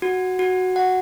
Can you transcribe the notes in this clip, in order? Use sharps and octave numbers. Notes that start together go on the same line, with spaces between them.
F#4
F#4
F#5